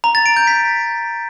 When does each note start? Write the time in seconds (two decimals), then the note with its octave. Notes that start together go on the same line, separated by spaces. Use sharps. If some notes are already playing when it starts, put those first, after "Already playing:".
0.04 A#5
0.15 A6
0.26 D7
0.36 G6
0.47 B6